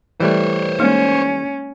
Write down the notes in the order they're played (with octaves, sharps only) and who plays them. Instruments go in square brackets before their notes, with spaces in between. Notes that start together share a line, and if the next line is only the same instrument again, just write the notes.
[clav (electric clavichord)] E3 G3 A3 [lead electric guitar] C5 C#5
[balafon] G#3 A#3 D#4 [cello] C#4